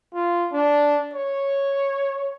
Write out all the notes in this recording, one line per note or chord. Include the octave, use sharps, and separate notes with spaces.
F4
D4
C#5